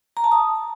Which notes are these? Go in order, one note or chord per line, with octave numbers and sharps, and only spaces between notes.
A#5
A5
D#6